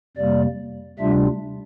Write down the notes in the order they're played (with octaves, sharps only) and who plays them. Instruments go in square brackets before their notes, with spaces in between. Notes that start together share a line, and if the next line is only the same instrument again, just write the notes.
[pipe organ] F2 C3 G3 A#3 D5
D2 C3 G3 D4 F4 E5